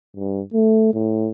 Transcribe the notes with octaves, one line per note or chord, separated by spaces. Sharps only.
G2
A3
A2